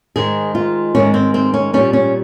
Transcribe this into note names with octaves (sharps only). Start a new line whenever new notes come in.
G#2 D#3 G#3 G#4
F4
G#2 D#3 G#3 C#4
C4
C4
C#4
A#2 G3 C#4
C#4